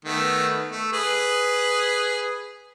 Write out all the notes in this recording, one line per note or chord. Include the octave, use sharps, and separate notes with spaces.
D#3 A3 B3
A3
G#4 B4